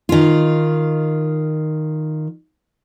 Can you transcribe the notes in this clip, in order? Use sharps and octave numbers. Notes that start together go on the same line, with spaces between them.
D#3 F4